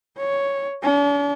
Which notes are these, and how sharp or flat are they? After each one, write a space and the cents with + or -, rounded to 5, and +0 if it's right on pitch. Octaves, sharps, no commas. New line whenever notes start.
C#5 +0
D4 -45